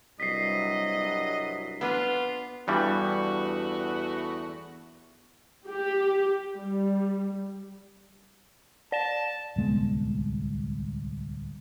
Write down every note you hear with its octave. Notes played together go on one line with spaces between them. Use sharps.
C2 G2 F#3 D#5 B6 C7
B3 D4 F4 B4
E2 G2 E3 G3 A3 B3 F#4
G4
G3
D5 A5 E7
D1 C2 G#3 B3